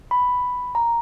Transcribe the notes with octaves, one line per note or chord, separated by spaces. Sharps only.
B5
A#5